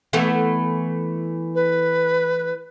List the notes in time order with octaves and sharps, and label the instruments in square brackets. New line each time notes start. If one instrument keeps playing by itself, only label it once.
[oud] E3 A3 B3
[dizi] B4